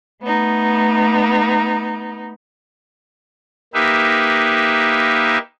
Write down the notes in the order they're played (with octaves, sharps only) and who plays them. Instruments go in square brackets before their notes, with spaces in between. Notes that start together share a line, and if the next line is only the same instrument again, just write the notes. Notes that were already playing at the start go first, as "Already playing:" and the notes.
[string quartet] A3 B3 D#4
[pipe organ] A#3 D#4 G4 B4 E5